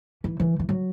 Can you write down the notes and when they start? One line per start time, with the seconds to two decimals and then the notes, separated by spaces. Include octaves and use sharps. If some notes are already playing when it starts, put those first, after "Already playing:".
0.24 E3
0.40 E3
0.59 E3
0.69 F#3